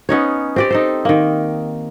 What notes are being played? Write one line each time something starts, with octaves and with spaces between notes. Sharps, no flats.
B3 C#4 D#4 C#5
C4 G4 D5
D#4 A4 C5
D#3 A#3